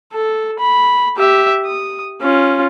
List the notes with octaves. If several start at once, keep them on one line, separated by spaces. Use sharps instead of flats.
A4
B5
G4 E5
D#6
C#4 F4